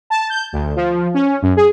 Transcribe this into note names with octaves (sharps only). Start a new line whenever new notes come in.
A5
G6
D2
F3
C#4
F#2
G#4